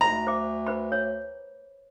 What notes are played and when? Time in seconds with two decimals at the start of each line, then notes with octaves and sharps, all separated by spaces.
0.01 D2 A#5
0.27 C5 D6
0.67 B4 C5 B5
0.92 C#5